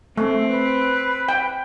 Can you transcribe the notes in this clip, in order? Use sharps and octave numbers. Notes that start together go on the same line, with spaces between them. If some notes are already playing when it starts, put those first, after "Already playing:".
A3 C4
B4
G5